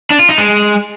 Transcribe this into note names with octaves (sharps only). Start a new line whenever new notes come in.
D4
F4
D#4
G#3